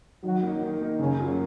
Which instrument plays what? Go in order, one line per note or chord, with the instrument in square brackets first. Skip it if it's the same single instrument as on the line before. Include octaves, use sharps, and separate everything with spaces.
[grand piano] D#3 [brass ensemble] F#3 F#4
[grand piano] A#3 D#4
D#3
A#3 D#4
[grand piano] F#2 [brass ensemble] C#3 C#4
[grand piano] C#3 F#3 A#3 F4